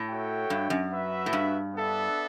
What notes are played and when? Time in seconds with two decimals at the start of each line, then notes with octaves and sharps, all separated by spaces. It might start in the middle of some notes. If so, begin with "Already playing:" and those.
Already playing: A2
0.08 F#4 C#5 E5 G5
0.50 G2
0.70 F#2
0.91 F#4 B4 E5
1.26 A2
1.33 G2
1.74 B3 D4 A4 E5